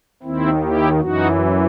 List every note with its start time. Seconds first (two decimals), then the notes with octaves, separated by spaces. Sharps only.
0.23 D#2 D#3 C4 E4
0.62 E4 G4
1.00 F#2 E3 D#4 F#4